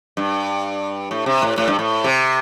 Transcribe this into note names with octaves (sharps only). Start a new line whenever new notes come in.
G2
A2
C3
A2
A2
G2
A2
C3